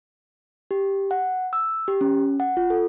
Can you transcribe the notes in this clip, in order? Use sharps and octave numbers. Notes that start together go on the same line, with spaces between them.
G4
F#5
E6
G4
C#4
F#5
F4
A4